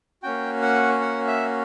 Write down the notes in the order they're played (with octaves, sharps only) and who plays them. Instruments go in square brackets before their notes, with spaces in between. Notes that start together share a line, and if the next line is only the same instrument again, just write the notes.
[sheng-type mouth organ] A#3 C#4 F#4 G5
F#5
F#5
E5